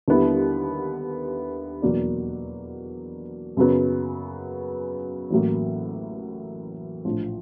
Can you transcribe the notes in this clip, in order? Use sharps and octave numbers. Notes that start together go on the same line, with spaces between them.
D#2 D3 G3 B3 E4
E2 B2 F#3 A#3 D4
F#2 C#3 F#3 B3
A1 A2 F#3 A#3
A#1 A2 F3